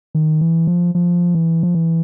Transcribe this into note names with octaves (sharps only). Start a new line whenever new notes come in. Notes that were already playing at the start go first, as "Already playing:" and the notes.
D#3
E3
F3
F3
E3
F3
E3